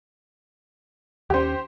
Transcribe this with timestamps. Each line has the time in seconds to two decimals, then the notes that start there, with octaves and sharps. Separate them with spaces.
1.30 D#2 C#4 G4 C5